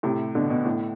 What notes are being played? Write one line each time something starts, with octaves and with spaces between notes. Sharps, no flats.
A2 C3
B2 D3
B2
A2